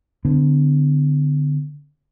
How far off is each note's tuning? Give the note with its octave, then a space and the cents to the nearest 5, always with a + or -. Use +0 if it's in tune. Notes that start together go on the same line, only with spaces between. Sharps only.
D3 +0 B3 +45